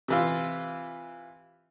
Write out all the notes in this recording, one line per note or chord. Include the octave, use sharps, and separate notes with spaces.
C3 E3 F4